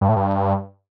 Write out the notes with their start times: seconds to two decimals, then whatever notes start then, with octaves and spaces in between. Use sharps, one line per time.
0.01 G2
0.09 A2
0.16 G2